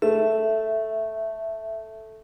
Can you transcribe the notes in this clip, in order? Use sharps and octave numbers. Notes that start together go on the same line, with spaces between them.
A3 E5